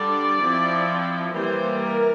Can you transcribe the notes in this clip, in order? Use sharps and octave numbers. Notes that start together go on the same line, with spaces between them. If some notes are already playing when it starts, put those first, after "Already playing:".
Already playing: D3 G3 D4 D5
F3 C4 E4
E3 G3 A#3 C5
A#4